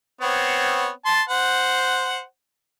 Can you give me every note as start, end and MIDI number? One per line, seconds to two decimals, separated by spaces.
0.21 0.90 59
0.21 0.90 60
0.21 0.90 73
1.05 1.22 81
1.05 1.22 84
1.29 2.22 72
1.29 2.22 78